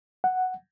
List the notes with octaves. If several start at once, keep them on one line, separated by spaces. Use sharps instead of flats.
F#5